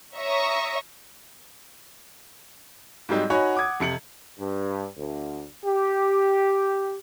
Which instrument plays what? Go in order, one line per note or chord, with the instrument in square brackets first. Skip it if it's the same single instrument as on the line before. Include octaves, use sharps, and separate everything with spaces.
[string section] C#5 E5 A#5 C#6 D#6
[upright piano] G#2 F#3 G3 C4 D#4
D#4 F#4 C#5 F#5 G#5 B5
F#5 D6 D#6 G#6
F2 C3 C#7 F#7
[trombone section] G2
D2
G4